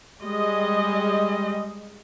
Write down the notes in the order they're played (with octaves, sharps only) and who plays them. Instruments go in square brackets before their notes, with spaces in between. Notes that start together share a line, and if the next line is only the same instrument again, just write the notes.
[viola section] G3 G#3 D#5